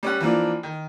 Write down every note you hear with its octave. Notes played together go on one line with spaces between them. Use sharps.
G3 C#4 F#5
E3 F3 A#3 D4
D#3